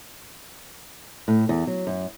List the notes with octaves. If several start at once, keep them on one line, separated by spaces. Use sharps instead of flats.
A2
E2
F#3
F#2